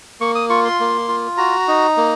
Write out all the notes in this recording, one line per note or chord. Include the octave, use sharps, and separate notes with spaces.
A#3 C#6
D#6
F4 C#6
C6
A#3
F4
F#4 A#5
D#4
A#3